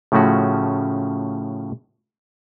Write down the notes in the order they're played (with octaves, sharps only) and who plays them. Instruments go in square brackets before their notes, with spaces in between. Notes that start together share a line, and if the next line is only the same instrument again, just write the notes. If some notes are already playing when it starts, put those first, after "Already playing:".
[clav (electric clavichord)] A2 C#3 F3 A3 C#4 F#4